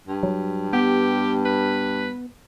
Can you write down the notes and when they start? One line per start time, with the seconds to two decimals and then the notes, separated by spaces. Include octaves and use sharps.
0.08 G2
0.23 F#3
0.73 B3 G4
1.45 B4